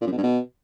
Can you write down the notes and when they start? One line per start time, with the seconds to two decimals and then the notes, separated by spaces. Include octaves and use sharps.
0.01 A#2
0.07 F#2
0.12 B2
0.18 G2
0.23 B2